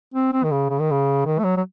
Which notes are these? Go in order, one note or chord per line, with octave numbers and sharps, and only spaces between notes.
C4
C4
D#3
C#3
C#3
D#3
C#3
D#3
A3
F#3
F#3